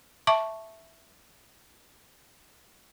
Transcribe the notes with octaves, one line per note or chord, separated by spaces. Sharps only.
E5 A5 C#6 D6